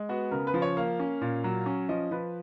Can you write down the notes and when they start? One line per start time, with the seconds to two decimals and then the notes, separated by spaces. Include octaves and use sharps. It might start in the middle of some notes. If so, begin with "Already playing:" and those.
Already playing: G#3
0.09 B3 F#4
0.31 C#3 A#4
0.47 B4
0.54 F3
0.62 C#5
0.77 A#3 F5
0.99 C#4
1.21 A#2
1.44 F#3
1.66 C#4
1.89 F3 D#5
2.11 F3 B4